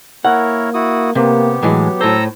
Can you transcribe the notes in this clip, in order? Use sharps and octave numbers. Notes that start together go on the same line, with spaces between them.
A#3 E4 A#4 C#5 F#5
E4 F#4 D#6
C3 A#3 B3 G4
A2 E3 F#3 G#3
A2 A4 C5 A#5 E6